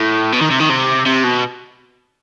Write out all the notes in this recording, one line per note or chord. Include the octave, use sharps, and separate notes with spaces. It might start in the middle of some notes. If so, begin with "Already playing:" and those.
Already playing: A2
B2
D#3
C3
D#3
C3
C3
B2